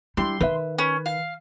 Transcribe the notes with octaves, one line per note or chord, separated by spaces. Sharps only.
G3 D4 E4 G4 C6
D#3 B4 E5
C#4 B4
F5